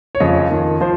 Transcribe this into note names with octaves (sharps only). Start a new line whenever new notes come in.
C#5
F2 C#3 F3 D#5
F2 D#3
F3 C5